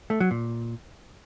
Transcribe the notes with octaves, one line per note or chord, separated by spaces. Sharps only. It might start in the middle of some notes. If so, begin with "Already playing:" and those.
A3
F#3
A#2